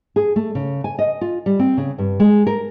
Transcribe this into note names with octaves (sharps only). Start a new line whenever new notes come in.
G#4
A3
C#3
G#5
D#5
F4
G3
C4
C#3
G2
G#3
A#4